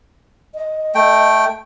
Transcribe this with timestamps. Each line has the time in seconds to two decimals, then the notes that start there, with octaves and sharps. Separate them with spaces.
0.55 D#5
0.95 A3 G5